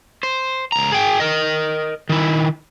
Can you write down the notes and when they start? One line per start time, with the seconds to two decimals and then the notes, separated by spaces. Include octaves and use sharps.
0.23 C5
0.72 C#2 A#5
0.92 G#4 G5
1.20 A#4 D#5
2.09 D#3 E4